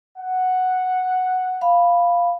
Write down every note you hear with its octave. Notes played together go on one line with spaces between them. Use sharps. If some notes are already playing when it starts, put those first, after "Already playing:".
F#5
F5 B5